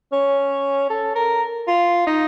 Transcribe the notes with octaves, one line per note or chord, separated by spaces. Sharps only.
C#4
A4
A#4
F4
D#4